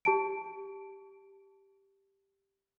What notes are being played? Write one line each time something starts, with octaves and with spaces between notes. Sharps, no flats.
G4 A5 D7